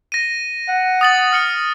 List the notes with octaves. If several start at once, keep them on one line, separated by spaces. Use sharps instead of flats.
A#6 D#7
F#5
D#6 A6 F#7
F6 C#7 F#7